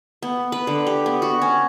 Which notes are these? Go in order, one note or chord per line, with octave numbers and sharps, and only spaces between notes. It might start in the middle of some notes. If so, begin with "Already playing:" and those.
B3
B4
D3
G4
B3
F#4
C#4